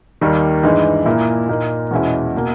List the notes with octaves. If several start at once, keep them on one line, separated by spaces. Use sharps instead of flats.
D#2 D#3 G3 A#3
G2 E3 G#3 D#4
A#2 A#3 E4
A#2 A#3 D#4
E2 B2 G#3 C#4 E4
B2 A#3